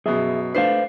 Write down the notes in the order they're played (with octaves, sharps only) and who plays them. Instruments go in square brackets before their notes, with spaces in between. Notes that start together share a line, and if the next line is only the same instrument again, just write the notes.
[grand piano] F#2 B2 [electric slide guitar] G#4 E5
[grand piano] A3 D4 C7 [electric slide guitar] B4 C5 F5